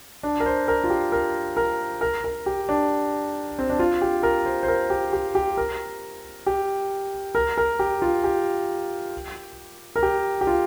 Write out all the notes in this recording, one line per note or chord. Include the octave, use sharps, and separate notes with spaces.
D4
A#4
C5
A#4
F4
G4
A#4
A#4
A#4
A#4
G4
D4
C4
D4
F4
G4
A#4
C5
C5
A#4
G4
G4
G4
A#4
G4
A#4
A#4
G4
F4
G4
A#4
G4
G4
F4